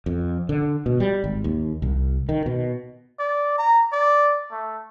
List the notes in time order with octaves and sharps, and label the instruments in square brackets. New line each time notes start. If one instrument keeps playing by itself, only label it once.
[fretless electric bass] F2
D3
B2
G3
G#1
D#2
C2
D#3
B2
[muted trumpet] D5
A#5
D5
A3